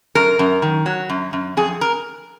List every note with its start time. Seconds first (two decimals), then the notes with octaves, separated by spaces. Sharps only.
0.15 F#2 A#4
0.39 F#2
0.62 D#3
0.86 F#3
1.10 F#2
1.33 F#2
1.57 F2 G#4
1.81 A#4